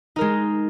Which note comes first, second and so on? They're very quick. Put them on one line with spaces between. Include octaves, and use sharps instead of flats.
D#4 A#4 G#3